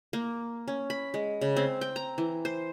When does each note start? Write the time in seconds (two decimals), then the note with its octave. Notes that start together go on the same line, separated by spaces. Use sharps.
0.13 A#3
0.68 C#4
0.90 B5
1.14 G#3
1.41 C#3
1.56 C4
1.81 G5
1.96 A#5
2.18 E3
2.45 C5